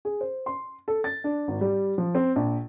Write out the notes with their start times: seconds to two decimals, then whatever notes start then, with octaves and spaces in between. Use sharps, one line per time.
0.05 G#4
0.21 C5
0.46 C6
0.88 A4
1.04 A6
1.24 D4
1.48 G#1
1.61 G3
1.98 F3
2.15 C4
2.36 A#1